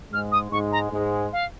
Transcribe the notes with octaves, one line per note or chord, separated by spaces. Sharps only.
G#2 G#3 F6
D#6
G#2 G#3 C#6
A#5
G#2 G#3
F5